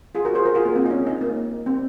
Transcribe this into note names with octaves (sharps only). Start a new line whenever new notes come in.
F4 G#4
F#4 A#4
G#4 C5
F#4 A#4
F4 G#4
A#3
C4
D#4
C#4
D#4
A#3
C4